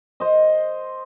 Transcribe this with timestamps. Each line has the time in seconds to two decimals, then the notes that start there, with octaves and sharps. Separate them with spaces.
0.20 C5 D#5